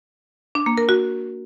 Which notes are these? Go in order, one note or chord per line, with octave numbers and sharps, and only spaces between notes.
D4
A#3
A#4
F#4